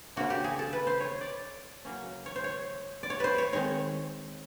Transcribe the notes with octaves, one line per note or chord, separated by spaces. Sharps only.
C#3 F3 A#3 D4 F#4
G4
G#4
A4
B4
C5
C#5
D5
C#3 F#3 A#3 C#4
C#5
C5
C#5
D5
C#5
B4 C5
C#5
D#3 G#3 C4 C#5